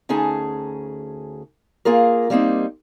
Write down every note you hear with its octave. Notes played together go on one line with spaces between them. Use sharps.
D2 C#4 D#4 G#4 A5
A#3 F4 G#4 A#4
G3 A#3 C4 D#4